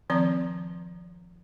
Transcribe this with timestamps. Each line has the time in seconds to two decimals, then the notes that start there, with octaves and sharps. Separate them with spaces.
0.10 D#3 F3 C4 D5 A#5